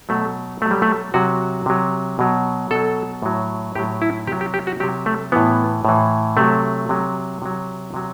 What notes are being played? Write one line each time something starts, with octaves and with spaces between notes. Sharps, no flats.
B2 F#3 A3
B2 F#3 A3
G3
A3
C3 F#3 F#4
C3 F#3
B2 F#3
B2 F#3 A4
A2 F#3
A2 F#3 G4
E4
C3 F#3 G4
G4
G4
F#4
C3 F#3 G4
A3
A2 E3 B3
A2 E3
C3 F#3 A3
C3 F#3
C3 F#3
C3 F#3